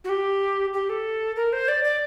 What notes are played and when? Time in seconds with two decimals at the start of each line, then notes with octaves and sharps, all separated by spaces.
0.04 F#4
0.09 G4
0.74 G4
0.89 A4
1.36 A#4
1.53 C5
1.68 D5
1.84 D5